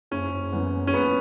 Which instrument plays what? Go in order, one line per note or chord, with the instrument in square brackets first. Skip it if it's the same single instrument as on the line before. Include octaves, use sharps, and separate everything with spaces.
[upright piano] F#1 [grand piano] C#4
[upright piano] F#2 E3 B3
[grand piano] C#4
[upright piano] F#1 [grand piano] B3